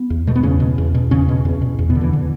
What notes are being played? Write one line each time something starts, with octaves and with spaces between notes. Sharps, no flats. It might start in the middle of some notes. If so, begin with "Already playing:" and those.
Already playing: B3
E2
B2 A3
B3
E2 C#3 C#4
B2
E2
B2
E2 C#3 C#4
B2
E2
B2
E2
B2 B3
D3
E3
D3